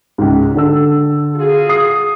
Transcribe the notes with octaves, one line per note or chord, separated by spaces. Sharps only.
C#2 G#2
D3 A4 E6
F4 F#4 G#4
D#6 C7